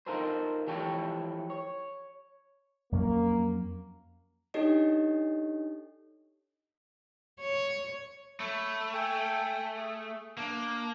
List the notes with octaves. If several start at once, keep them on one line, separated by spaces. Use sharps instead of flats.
D#4 F4 A4 A#4 C5
E3 F3 G4 A4 B4 C#5
C#5
F2 F#3 A#3 C#4
D4 D#4 G4 A4 C#5 D#5
C#5
A3 A4 C#5 B5
A4 G5 G#5
G#4
A#3 D4 F5